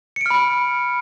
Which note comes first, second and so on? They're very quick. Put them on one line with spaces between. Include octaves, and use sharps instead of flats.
C#7 D7 F6 B5